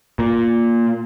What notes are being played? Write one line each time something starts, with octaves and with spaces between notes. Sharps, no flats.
A#2